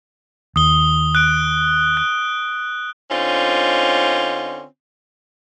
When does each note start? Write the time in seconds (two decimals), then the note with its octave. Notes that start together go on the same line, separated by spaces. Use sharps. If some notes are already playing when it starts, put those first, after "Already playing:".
0.56 D#2 D#6 G7
1.15 F#6 D7
1.97 F#6
3.10 D3 C4 C#4 D#4 F4